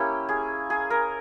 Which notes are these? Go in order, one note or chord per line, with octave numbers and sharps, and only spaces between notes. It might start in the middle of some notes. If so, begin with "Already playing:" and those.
Already playing: A#3 C#4 E4 G4
G#4
G#4
A#4